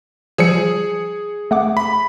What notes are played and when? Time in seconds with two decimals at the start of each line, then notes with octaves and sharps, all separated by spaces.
0.38 F3 G3 G#4 E6 C#7
1.51 A3 F#5 D6
1.77 B5